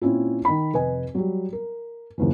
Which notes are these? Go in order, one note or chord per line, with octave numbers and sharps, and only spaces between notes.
A#2 C4 C#4 E4 F4
D#3 B5
F1 B4 D#5 G#5
F#3 G3
A#4
F#1 D#2 E3